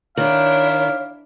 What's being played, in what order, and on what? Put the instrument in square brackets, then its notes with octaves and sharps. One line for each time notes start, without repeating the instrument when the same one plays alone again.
[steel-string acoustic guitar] D#3 [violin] D4 E4 [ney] C#5 [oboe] F5